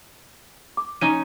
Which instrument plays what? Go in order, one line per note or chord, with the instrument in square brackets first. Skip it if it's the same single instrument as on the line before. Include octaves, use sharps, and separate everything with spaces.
[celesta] D6
[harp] C#4 D#4 [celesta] D#7